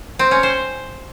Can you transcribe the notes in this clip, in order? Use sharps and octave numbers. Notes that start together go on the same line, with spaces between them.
C4
C#4
C5